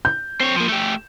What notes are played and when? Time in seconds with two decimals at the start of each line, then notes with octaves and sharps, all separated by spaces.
0.05 G6
0.40 C4 C#5
0.56 F3 A#3
0.69 A3 G4